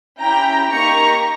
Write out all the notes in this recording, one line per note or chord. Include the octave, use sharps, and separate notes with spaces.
C#4 E4 G4 G5 A#5
A#3 D#4 G4 A#5 C#6